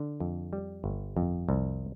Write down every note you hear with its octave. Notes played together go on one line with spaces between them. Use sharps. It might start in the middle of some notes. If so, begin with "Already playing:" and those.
Already playing: D3
F2
G3
G1
F2
C2